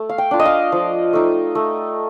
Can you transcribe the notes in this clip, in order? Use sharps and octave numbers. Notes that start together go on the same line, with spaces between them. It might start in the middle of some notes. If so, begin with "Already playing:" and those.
Already playing: A3
F5
G5
D4 F4
D#5
F5
F3
A3 D#4
A3